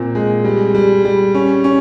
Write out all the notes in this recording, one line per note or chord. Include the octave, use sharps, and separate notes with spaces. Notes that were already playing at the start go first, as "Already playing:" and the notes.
Already playing: A#2 C4
G#3
G3
G3
G3
C#4
C#4